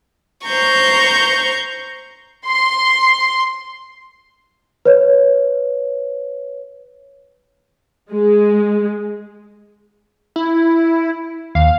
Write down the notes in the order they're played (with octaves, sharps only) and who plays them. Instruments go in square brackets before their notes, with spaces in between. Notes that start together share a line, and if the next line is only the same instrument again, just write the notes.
[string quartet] C5 A#5 C#6 G6
[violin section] C6
[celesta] B4 C#5
[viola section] G#3
[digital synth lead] E4
[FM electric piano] D#2 [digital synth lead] F5